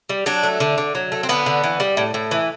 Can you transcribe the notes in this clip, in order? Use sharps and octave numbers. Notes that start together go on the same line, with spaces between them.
G3
F#3 D4
A3
D3
D3
F#3
A3
C4
D3 B3
D3
E3
G3
A2
A2
E3